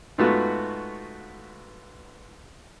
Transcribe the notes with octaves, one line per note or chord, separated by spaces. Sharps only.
G#2 A3 B3 F4 F#4